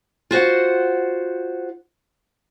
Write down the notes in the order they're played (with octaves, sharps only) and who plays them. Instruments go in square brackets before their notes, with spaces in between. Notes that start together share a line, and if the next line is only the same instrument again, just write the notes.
[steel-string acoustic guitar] F4 F#4 C5 F#5